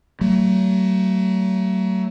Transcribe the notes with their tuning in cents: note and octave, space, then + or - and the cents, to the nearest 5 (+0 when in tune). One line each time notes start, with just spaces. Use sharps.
F#3 +35 A3 +35